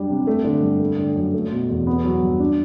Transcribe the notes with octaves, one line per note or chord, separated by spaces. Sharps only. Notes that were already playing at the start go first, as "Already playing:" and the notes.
Already playing: F#2 G3 D4
C3
A3
D3
G2
A3
D3
F#2
A3
B2
E2
B3
F#3
G2
D4